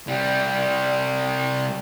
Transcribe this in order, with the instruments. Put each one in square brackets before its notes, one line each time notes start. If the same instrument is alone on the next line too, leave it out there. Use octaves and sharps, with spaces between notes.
[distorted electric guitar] C2 G3